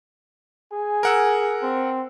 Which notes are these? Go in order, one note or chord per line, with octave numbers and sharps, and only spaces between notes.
G#4 G#5
A#4 F#5 E6
C4